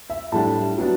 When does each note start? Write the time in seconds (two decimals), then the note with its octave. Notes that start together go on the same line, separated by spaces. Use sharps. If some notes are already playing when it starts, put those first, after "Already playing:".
0.10 E5
0.32 A2 G3 D4 A5
0.77 F#3 B3 D4